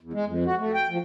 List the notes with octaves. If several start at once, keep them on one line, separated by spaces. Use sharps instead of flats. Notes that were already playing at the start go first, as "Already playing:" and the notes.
E2
G#3
F2
F#4
A3
G5
F3